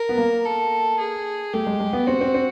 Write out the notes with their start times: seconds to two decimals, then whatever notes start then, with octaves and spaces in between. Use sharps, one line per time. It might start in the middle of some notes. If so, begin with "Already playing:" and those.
Already playing: A#4
0.09 B3
0.18 A#3
0.45 A4
0.99 G#4
1.53 A3 G4
1.67 G#3
1.80 G#3
1.93 B3
2.06 C4 F#4
2.21 C4
2.34 C4